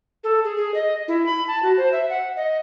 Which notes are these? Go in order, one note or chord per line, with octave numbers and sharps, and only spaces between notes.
A4
G#4
G#4
D#5
E4
B5
A5
F#4
C5
E5
F#5
D#5